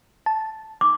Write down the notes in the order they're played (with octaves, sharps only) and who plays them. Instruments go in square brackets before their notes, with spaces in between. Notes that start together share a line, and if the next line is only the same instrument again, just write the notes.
[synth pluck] A5
[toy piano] D6